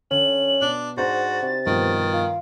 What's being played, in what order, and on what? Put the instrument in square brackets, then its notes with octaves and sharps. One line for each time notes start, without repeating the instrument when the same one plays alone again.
[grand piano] D3 [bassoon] C#4 [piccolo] F#7
[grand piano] B2 [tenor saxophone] D4
[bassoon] G#2 [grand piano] D4 D#4 C5 [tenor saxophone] F#4 [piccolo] A6
[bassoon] C3
[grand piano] G2 B2 F3 [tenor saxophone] D#3
[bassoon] F4